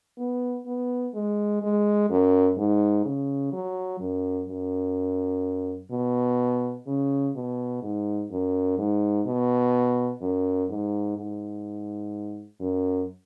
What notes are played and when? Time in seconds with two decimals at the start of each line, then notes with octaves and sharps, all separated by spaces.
0.18 B3
0.66 B3
1.14 G#3
1.62 G#3
2.09 F#2
2.57 G#2
3.05 C#3
3.52 F#3
4.00 F#2
4.48 F#2
5.91 B2
6.87 C#3
7.35 B2
7.82 G#2
8.30 F#2
8.78 G#2
9.26 B2
10.21 F#2
10.70 G#2
11.17 G#2
12.60 F#2